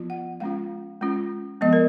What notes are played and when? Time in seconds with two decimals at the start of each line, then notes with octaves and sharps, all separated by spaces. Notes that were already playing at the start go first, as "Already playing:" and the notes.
Already playing: F3 B3 F4
0.10 F#5
0.40 G#3 C#4 F4 F5
1.01 G#3 C#4 F4
1.61 F3 G#3 B3 D#5
1.73 A#4